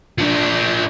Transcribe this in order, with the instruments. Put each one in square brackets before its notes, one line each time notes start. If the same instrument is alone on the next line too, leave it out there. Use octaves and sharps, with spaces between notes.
[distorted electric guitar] F3 D4